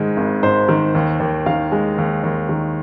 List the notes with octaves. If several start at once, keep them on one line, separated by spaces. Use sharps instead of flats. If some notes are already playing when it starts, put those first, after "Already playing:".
Already playing: G#2 D#3 G#3
G#1
G#2 C5
D#3
D#2
D#2
D#3 F5
G#3
D#2
D#2
D#3